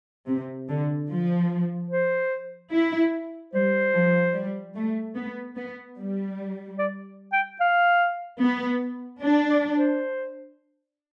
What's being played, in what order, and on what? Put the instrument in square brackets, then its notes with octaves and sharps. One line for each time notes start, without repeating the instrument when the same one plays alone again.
[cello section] C3
D3
F3
[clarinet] C5
[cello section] E4
[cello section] G3 [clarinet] C5
[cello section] F3
G3
A3
B3
B3
G3
[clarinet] D5
G5
F5
[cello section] B3
D4
[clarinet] D5
C5